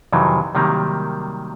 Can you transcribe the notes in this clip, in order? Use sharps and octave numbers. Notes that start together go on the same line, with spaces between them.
F2 C3 D#3 E3 F#3
C3 D#3 F#3 G3 A#3